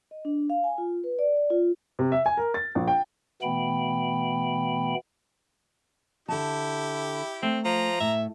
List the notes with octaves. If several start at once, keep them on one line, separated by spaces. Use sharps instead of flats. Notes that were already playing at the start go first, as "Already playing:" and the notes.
D#5
D4
F5
G#5
F4
B4
D5
D5
F4
C3
E5
G#5
A#4
A6
A#1
G5
B2 E3 A3 B3 G5 B5
D3 E4 G4 A5
A3 C4
F3 A#5
A2 E5